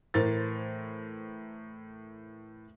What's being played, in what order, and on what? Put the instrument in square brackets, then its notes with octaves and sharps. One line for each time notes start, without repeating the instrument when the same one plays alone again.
[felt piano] A2 E3 A#4 C5 A6